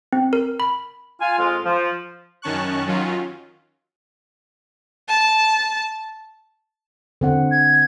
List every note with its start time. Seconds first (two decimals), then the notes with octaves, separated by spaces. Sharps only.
0.13 C4
0.33 A#4
0.60 B5
1.20 F4 G#5
1.38 F2 G#3 F4
1.64 F3
2.42 F#2 D#3 C#4 A5 C#6 F#6
2.86 D#3 F#3 C#4 F4
5.08 A5
7.21 D3 C4 F#5
7.51 G#6